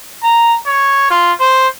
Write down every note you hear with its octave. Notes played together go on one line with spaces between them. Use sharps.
A#5
C#5
F4
C5